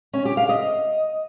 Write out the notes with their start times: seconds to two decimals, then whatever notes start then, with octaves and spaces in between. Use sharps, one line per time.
0.13 C#4
0.25 G4
0.37 F5
0.49 D#5